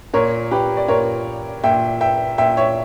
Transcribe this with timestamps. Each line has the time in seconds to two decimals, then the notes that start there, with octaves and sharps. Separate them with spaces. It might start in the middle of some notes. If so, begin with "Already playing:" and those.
0.13 A#2 A#4 C#5
0.51 G4 B4
0.77 D5
0.88 A#2 A#4 C#5
1.63 A#2 E5 G5
2.01 E5 G5
2.38 A#2 E5 G5
2.57 C#5 E5